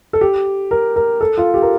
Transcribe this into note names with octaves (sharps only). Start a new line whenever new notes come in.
A4
G4
A#4
A#4
A4
F4
G4
A#4